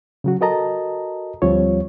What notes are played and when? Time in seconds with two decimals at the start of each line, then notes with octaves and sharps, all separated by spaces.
0.24 C#3 F#3 F#4
0.41 F#4 A4 A#4 D#5 A5 A#5
1.42 D2 F3 G3 C4 F4 C#5